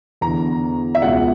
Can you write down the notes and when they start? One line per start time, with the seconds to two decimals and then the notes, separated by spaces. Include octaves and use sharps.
0.21 E2 D3 A#5
0.95 E5
1.02 C#2 B2 F#5